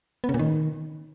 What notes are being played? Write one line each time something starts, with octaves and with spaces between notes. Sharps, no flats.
B3
C#3
A#2
D#3